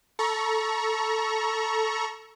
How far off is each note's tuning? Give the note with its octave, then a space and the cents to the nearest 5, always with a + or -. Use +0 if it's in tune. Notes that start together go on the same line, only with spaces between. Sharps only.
A4 +0 A#5 +30 C#6 +0